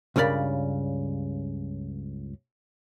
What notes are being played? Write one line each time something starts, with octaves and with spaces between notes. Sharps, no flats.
C#2 G2 C#3 A#4 D5 B5